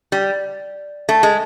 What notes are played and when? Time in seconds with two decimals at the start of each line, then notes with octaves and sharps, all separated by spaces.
0.12 G3
1.09 A3
1.23 G#3